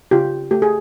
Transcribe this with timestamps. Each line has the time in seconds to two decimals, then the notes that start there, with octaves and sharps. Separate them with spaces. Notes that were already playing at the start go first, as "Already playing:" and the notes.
0.11 C#3 F4 G4
0.51 A3 G4
0.62 G#4